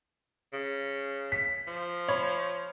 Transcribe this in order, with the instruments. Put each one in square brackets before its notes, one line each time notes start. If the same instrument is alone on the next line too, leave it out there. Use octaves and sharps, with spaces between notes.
[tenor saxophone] C#3
[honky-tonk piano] B6
[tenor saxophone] F3
[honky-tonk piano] C#5 B5